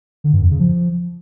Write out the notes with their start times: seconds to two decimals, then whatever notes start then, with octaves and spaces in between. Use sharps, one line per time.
0.24 D3
0.33 G2
0.42 F2
0.51 C#3
0.59 F3